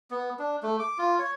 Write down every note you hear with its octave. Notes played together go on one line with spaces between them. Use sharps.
B3
D4
A3
D6
F4
C#5